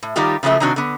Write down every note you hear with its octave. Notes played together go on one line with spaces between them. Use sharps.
A2
D#3 G3 D#4 F4 G4
C#3 F3 F#3 A3 E5
C3 D#3 C4 D4 F#4
D3 B3